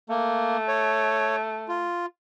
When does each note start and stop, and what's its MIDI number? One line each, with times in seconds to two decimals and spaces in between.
0.09 1.91 57
0.09 0.57 58
0.68 1.36 73
1.68 2.06 65